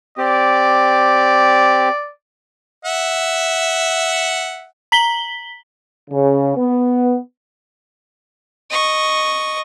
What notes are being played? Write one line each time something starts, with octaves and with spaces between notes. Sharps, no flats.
C4 G4 D5
E5 F#5
A#5 B6 F#7 G7
C#3
B3
D#5 C#6